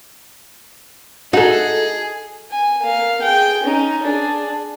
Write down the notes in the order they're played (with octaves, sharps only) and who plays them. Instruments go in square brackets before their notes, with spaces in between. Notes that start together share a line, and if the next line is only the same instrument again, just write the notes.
[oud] D#4 A4 [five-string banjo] F#4 [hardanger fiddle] G#4
[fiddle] G#5
A#3 F5
G#4 G5
C#4 D#4
D4 G#4